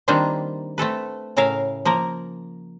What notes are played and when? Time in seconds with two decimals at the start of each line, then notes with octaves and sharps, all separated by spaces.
0.08 D#3 G3 A#3 C4 D4 F4
0.78 A3 C4 A4 B4
1.37 A2 C#3 A#4 E5 F5
1.85 F3 A#3 A#4